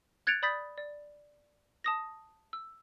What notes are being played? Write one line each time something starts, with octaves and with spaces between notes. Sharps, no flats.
F#6 G#6 A6 C#7 D7 F7
D5 B5 D#6 G6 A6 B6
D5
A5 D#6 A#6
E6